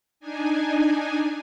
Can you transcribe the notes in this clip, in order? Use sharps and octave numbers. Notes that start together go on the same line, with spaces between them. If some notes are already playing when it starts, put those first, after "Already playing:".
D4 D#4 G#5